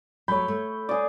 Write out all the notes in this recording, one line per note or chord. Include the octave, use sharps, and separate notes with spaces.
F#3 A3 C#5 B5 G6
A3
G#4 D5